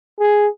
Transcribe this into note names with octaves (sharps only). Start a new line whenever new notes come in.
G#4